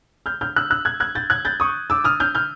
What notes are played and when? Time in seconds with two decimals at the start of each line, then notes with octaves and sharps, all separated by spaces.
0.26 F6 G6
0.41 F6 G6
0.56 E6 F#6
0.70 E6 F#6
0.85 F#6 G#6
1.00 F#6 G#6
1.15 G6 A6
1.30 F#6 G#6
1.45 G6 A6
1.60 C#6 D#6
1.90 D6 E6
2.04 D#6 F6
2.20 F6 G6
2.35 F6 G6